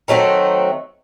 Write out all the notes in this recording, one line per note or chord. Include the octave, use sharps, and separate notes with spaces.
D#3 F#3 A3 C4